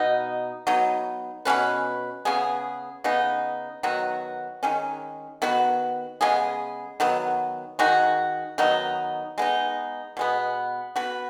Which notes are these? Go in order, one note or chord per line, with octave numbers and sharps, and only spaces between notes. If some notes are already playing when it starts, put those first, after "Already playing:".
Already playing: B2 B3 D#4
F#3 B3 D#4
B2 G#3 C#4 B4
C#3 B3 G#4
C#3 B3 D#4
D#3 F#3 B3 F#4
D#3 G#3 C#4
D#3 B3 F#4 B4
C#3 G#3 B3 G#4
D#3 F#3 B3
D#3 G#3 D#4 F#4
D#3 F#3 B3 D#4
G#3 B3 D#4
B2 G#3 B3
B3 F#4 B4